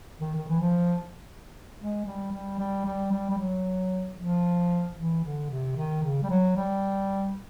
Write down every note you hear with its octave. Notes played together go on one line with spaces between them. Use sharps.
D#3
D#3
E3
F3
G#3
G3
G3
G3
G3
G3
G3
F#3
F3
E3
D3
C3
D#3
C#3
G3
F#3
G3